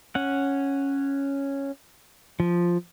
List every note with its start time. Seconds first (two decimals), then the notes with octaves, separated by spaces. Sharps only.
0.15 C#4 F#5
2.40 F3